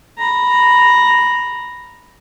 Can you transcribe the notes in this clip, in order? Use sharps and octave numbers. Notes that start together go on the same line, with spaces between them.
A#5 B5